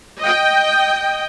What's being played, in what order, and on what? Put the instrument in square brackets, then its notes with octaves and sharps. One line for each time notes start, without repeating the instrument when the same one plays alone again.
[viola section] D#5 G5